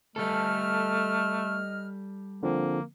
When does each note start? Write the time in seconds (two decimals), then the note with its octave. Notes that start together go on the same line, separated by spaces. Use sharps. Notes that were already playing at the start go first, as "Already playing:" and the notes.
0.16 G3 A3 A4 D#5 F6
2.43 D3 F3 A#3 C4